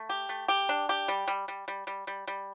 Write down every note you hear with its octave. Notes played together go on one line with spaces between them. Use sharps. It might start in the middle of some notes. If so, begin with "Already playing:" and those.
Already playing: A3
G4
A3
G4
D4
G4
G3
G3
G3
G3
G3
G3
G3